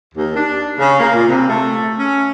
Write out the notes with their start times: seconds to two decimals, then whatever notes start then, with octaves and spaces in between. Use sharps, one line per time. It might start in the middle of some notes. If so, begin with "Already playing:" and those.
0.15 D#2
0.35 D4
0.78 C#3
1.00 A#3
1.14 A#2
1.28 C3
1.49 A3
1.98 C#4